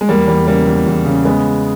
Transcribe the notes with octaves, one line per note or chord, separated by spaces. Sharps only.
G#3
E2 G3 A#3
E2 G3
C#3 G3 A#3
E2
E2
C#3
G#3 B3